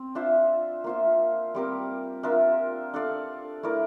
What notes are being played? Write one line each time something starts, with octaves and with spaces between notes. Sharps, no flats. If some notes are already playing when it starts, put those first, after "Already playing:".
Already playing: C4
D4 F4 C5 E5
A#3 F4 C5 E5
G3 C4 G4 A#4
D4 F4 A#4 E5
D4 A4 D5 F5
A3 E4 A#4 D5